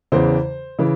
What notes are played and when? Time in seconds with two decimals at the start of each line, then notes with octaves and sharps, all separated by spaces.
0.12 E2 C#3 E3 C5
0.79 C#3 E3